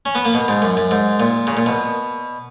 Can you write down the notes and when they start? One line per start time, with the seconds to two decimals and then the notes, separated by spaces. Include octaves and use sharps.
0.06 C#4
0.15 B3
0.25 A#3
0.34 B2
0.48 G#2
0.62 F#2
0.77 F#2
0.91 G#2
1.20 A#2
1.47 C#3
1.57 A#2
1.66 B2